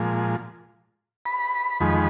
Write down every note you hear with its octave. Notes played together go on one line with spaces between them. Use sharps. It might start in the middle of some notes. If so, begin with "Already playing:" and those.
Already playing: A#2 F3 G#3
B5
F2 D#3 G#3